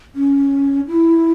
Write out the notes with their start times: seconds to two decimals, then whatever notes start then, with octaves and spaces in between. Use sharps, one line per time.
0.15 C#4
0.87 E4